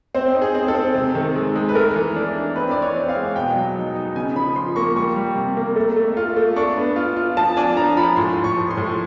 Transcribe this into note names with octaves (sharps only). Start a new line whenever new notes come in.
C4 C5
D#4
G#4
C4
A4
C4
C3
D#3
G#3
G#3
B4
A3 A#4
E3
D4
D4
C4 B4
E3 D5
C#5
C4
F5
G#3
B2 G5
F#3
D#4
D#4
C#3 G#5
F3 B5
F3 C6
A#3 C#6
G3 C#6
G3
C3
A#3
A3
A3
F4
A3
D4 C#6
B3
F4
F4
F3 A5
D4 G#5
F3 A#5
F3 B5
A2 C6
A2
C#6
F3
C6
A2